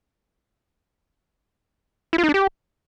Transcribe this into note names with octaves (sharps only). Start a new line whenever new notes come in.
E4
F4
D#4
D4
G4